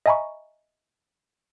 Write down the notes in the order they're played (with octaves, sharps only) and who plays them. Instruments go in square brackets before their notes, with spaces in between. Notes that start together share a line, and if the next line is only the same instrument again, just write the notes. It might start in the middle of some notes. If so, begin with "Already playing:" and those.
[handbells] D#5 E5 G#5 A#5 B5 C#6